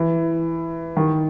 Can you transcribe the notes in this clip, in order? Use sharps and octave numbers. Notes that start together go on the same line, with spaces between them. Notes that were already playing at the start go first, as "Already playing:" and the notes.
Already playing: E3
D#3